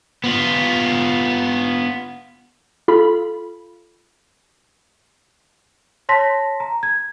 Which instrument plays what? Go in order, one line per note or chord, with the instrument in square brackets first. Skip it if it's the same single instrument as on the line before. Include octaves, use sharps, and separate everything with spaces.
[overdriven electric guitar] B3 F4
[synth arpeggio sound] F4 A4 B5
[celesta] C#5 A5 C6 A#6 B6
A#5
G#6